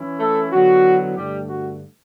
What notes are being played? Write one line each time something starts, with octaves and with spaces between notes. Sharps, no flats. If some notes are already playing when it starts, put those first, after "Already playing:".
Already playing: E3 C#4 E4
A3 A4
D3 F#3 B3 E4 F#4
G2 D3 G3 A3 G4
F#4